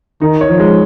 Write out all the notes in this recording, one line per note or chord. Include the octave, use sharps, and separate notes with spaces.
D#3 D#4
C#5
F3
G#3